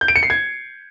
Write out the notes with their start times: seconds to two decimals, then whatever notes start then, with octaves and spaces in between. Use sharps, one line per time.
0.01 G6
0.08 D7
0.16 C#7
0.23 C7
0.30 G#6